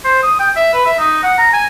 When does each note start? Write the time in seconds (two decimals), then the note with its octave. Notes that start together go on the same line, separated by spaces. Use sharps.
0.04 C5
0.23 D#6
0.40 G5
0.56 E5
0.74 B4
0.86 E5
0.99 D#4
1.23 F#5
1.38 A#5
1.53 G#5